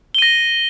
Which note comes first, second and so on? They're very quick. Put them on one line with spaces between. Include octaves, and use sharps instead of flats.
G7 D#7 A#6